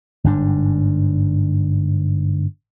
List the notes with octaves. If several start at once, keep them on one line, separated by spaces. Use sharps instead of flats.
G1 G#2 D4